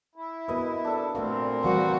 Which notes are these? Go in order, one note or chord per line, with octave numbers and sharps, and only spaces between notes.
E4
B3 F#4 A#4 B4 D#5 G#5
D4 A4
A#2 A3 C4 F#4 A#4 F5
E3 G3 A#3 F#4 B4 C5